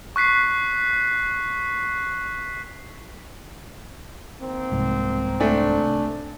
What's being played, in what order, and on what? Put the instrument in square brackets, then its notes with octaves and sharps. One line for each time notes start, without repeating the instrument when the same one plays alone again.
[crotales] C#6 F#6 B6 C7
[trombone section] D#3 A#3 C4
[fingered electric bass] C2 G#2
[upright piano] A3 D4 G#5